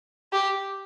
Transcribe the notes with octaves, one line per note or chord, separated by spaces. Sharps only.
G4